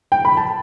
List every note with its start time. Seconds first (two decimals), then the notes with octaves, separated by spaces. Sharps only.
0.12 G5
0.25 B5
0.37 A5